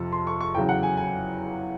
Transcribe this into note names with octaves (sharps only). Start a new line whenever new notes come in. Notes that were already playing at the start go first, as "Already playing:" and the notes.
Already playing: F2 C3 F3 A5
C6
C#6
C#6
E2 C#3 F#3 G5
F#5
G#5
G#5